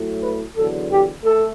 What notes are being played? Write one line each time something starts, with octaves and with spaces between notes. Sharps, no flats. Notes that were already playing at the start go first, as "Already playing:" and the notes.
Already playing: A2 F#3 A3
B4
E2 D3 F#3 A4
G4
A3 A4